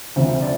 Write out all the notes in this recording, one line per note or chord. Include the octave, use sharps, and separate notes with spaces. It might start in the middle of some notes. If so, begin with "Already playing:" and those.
D2 C3 F3 C5
D5